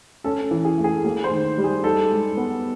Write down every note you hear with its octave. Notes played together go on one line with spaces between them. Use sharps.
C#4 A4
E3
G#4
A3
G#4
A#3 G#4
C5
D#3
G3
G#4
D#4 A4
G#3
B3